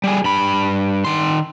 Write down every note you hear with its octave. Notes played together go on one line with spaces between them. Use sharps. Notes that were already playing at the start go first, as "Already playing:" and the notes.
G3 G#4
G2 B5
D#3 C6